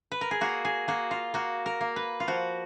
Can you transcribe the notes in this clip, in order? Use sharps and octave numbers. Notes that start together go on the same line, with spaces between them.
B4
A#4
G#4
A#3 F#4
G#4
A#3 F#4
F4
A#3 F#4
A#4
A#3
B4
F4
F3 F#4